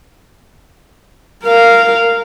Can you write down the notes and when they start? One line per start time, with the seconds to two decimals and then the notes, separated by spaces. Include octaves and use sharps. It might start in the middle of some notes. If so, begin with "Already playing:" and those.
1.45 A#4 F5